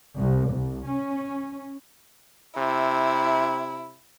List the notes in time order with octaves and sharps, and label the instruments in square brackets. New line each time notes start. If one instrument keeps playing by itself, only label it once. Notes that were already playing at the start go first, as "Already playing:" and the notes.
[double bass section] C2
C2
C#4
[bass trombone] C3 [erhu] E4